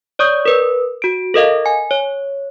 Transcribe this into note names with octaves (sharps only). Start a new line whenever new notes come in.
C#5 D5 C#6 D#6 G6
A#4 B4
F#4 D7
A4 A#4 D#5 F5
G#5
C#5